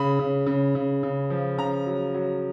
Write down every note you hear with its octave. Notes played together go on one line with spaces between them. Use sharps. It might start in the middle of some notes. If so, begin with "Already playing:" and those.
Already playing: C#3 B5
C#3
C#3
C#3
C#3
F3
C#3 A#5
F#3
F#3